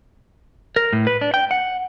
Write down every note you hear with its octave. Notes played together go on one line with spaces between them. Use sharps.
A#4
A2
B4
D4
G5
F#5